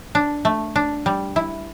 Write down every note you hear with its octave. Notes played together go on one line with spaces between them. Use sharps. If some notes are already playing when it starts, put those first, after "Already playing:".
D4
A3
D4
G3
E4